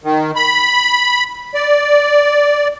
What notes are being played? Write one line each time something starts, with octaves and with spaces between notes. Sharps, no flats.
D#3
B5
D5